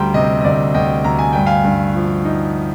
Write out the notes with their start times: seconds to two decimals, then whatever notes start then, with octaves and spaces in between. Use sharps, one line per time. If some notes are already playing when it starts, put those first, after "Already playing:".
Already playing: D2 G3 G5 A#5 C6
0.14 C3 D#5
0.40 D#5
0.45 D2 D5
0.74 D2 D#5 G5
1.04 D2 A#5
1.19 G#5
1.32 G2 G5
1.46 F5 G#5
1.65 G2
1.95 F3
2.25 D#4